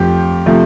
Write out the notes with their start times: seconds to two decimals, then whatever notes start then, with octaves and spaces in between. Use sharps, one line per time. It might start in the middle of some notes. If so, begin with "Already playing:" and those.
Already playing: F2 F3 A3 G4
0.46 C3 F3 A3